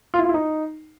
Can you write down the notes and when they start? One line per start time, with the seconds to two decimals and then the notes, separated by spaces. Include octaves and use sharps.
0.14 F4
0.19 E4
0.24 F4
0.29 E4
0.34 D#4